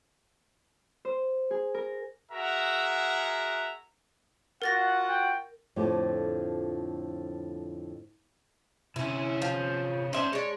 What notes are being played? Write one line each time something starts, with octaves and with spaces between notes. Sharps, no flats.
C5
G#4
A#4
F#4 G#4 A#4 E5 F#5 A#5
F4 F#4 A#4 F#5 A6 A#6
G5
F2 A2 D3 F3 G4
C3 C#4 E4
F3
C#4 C5 D5 E5
G#3 D4 C#5